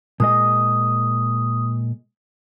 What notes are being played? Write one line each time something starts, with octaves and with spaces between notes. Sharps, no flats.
A#2 G#3 D#5 D#6